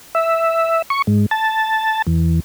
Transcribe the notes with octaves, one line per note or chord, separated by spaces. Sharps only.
E5
C#6
G#2
A5
E2